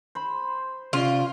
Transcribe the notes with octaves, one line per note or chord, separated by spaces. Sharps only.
C5 B5
C3 C#4 F4 D5